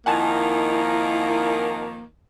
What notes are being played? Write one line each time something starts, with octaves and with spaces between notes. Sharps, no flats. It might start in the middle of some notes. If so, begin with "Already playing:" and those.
F2 D#3 A#3 D#4 E4 F#5 G#5 A5